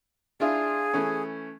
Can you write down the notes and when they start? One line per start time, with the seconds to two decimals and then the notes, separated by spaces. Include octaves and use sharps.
0.40 D4 E4 F4 G#4
0.93 E3 A3 C#4